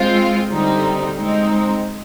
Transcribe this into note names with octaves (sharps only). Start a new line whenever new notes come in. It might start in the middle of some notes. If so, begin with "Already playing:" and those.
Already playing: G#3 C4 F4
D3 G3 C4 D#4
G#3 C4 D#4